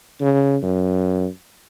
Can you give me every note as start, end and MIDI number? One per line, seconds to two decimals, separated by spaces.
0.20 0.57 49
0.62 1.26 42